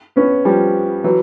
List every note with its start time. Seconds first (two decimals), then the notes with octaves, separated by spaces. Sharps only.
0.16 B3 C#4
0.45 F3 G3
1.04 E3 F#3